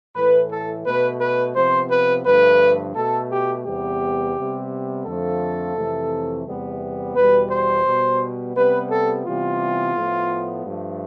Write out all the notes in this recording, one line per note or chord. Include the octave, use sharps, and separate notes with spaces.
A2 E3 A3 B4
A4
B2 A3 B4
B4
C3 F3 B3 C5
B4
G2 D3 F3 A3 B4
B2 A3 A4
G4
E2 C3 G3 B3 G4
C3 G3 B3
F2 D3 F3 A3 A4
F2 C3 E3 A3
E2 C3 G3 B3
E2 B2 G3 B4
C5
B2 G3 B3
C3 G3 B3 B4
A4
C3 E3 G3 B3 F4
A2 F3 B3
G2 F3 A3